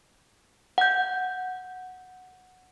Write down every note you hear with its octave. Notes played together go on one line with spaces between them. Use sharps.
F#5 G6